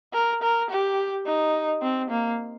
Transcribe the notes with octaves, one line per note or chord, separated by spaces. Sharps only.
A#4
A#4
G4
D#4
C4
A#3